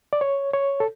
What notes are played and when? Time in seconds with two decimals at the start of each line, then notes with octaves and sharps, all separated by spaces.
0.13 D5
0.21 C#5
0.53 C#5
0.80 A4